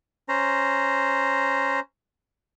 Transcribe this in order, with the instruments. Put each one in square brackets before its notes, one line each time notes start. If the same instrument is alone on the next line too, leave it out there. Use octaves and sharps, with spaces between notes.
[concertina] C#4 C5 A#5